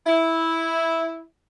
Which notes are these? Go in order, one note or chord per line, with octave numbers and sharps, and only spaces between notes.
E4